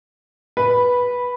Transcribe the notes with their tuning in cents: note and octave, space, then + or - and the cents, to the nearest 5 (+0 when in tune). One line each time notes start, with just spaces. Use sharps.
B4 -10 B5 +0